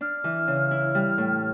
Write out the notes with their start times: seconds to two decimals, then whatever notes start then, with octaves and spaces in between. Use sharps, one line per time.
0.01 D4 F6
0.24 E3
0.48 C#3
0.71 E4
0.95 G3
1.18 A2